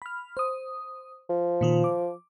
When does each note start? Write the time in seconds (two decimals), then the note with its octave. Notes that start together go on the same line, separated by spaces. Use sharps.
0.02 B5 F6
0.37 C5 D#6
1.29 F3
1.61 A#2 D#3 F4
1.84 D6